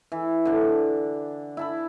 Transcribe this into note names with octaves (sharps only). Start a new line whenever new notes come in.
E3
D3 D4
E4 A5 B5